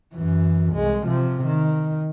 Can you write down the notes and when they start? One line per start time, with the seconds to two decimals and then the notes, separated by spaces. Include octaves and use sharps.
0.15 F#2 E3
0.74 C2 G#3
1.06 C3 F3
1.46 D#3